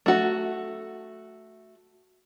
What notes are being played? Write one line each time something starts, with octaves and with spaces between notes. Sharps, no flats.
A3 F#4